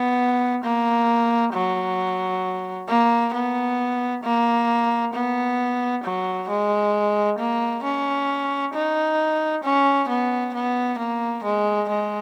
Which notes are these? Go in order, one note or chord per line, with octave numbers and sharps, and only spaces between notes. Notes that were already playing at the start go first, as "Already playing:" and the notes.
Already playing: B3
A#3
F#3
A#3
B3
A#3
B3
F#3
G#3
A#3
C#4
D#4
C#4
B3
B3
A#3
G#3
G#3